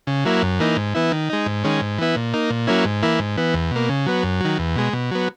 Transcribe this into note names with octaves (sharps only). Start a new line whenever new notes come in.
C#3
F#3 A#3 E4
F#2
E3 A#3 D#4
G#2
E3 B3 E4
D#3
G#3 D#4
G#2
D#3 G#3 C#4
G#2
E3 B3 E4
A#2
A#3 D#4
A#2
F#3 A#3 C#4 E4
G#2
E3 A#3 E4
G#2
E3 B3
E2
B2 A#3
C#3
F#3 B3
F#2
D#3 F#3
E2
B2 G#3
B2
F#3 B3